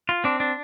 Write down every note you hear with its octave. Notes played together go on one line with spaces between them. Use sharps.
F4
C4 D4
D4